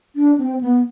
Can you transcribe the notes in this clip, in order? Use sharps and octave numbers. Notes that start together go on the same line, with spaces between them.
D4
C4
B3